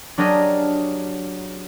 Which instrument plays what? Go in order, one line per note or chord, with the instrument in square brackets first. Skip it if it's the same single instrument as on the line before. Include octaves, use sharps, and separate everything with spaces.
[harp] F#3 D4 G4 G#4 A#4 D#5